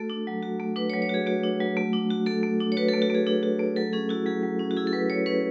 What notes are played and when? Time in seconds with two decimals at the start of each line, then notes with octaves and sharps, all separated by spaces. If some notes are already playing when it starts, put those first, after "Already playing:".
Already playing: A3 F#4 A4
0.10 D4
0.27 F#3
0.43 F#4
0.60 A3
0.76 D4 B4
0.90 C#5
0.93 F#3
1.02 C#5
1.09 F#4 G#4
1.26 A3 F#4
1.43 D4
1.60 F#3
1.77 A3
1.93 D4
2.10 F#4
2.26 A3 A4
2.43 A3
2.60 D4
2.72 C#5
2.77 F#4 B4
2.89 A3 A4
3.02 F#4
3.10 A3 G#4
3.26 D4 G#4
3.43 F#4
3.59 A3
3.76 F#3 A4
3.93 C#4 G#4
4.09 E4 F#4
4.26 F#3 G#4
4.43 F#3
4.59 C#4
4.71 F#4
4.77 E4 G#4
4.87 A4
4.93 F#3 B4
5.10 F#3 C#5
5.26 C#4 B4